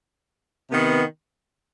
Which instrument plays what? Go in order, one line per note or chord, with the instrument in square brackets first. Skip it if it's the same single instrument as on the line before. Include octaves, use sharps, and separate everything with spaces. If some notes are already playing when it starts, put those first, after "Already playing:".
[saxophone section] C3 D#3 B3